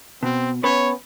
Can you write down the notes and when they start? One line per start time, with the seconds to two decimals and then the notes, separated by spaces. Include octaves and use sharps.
0.23 B2 C4
0.63 B3 C#4 B4 C#5